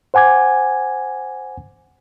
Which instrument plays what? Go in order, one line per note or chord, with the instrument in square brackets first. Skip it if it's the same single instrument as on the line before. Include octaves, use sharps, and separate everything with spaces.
[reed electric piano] C5 F#5 G#5 D6 G#6